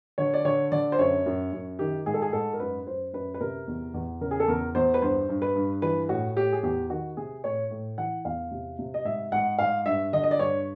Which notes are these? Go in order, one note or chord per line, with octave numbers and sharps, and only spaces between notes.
D3 C#5
D5
D3 C#5
D3 D5
C5
F#2 C#5
F#2
F#2
D#3 G4
G#2 G#4
A4
G#4
G#2 A4
A#4
F#2 B4
F#2 C5
F#2 B4
B4
C3 A#4
E2
E2
C#3 A#4
G#4
A4
E2 A#4
E2 C5
B4
G2 C5
G2
B4
G2
E3 B4
A2 F#4
A2 G4
G#4
E2 G4
D#3 F#4
C3 G#4
A2 C#5
A2
E3 F#5
E2 F5
C3
C3
D#5
G#2 E5
G#2 F#5
G#2 F5
G2 E5
D3 D#5
D#5
D5
G2 C#5